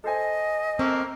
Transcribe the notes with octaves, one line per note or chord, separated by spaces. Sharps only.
A4 C5 D#5 G#5
A3 A#3 C4